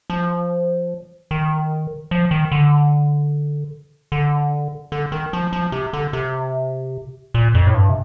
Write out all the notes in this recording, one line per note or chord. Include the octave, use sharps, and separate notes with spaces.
F3
D#3
F3
D#3
D3
D3
D3
D#3
F3
F3
C3
D3
C3
A#2
F2
A2
G2
C3